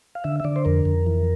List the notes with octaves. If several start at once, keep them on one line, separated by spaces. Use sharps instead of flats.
F5
D3 E5
E5
D3 D5
C5
F2 A#4
F2
E3